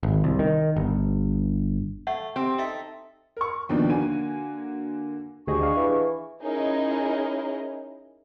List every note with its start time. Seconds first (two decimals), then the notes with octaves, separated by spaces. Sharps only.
0.03 G#1
0.24 C2
0.39 D#3
0.76 G1
2.07 A3 F#5
2.36 C4 G4
2.58 D#4 A4 E5
3.37 A#4 C#6
3.69 D#2 B2 F3 A#3 D4 D#4
3.90 D3 A#3 F#4 G#5 D#7
5.47 D2 G4 G#4 D#5 C#6
5.61 D4 F5
5.77 E3
6.42 C#4 D#4 E4 G#4 A#4 D#5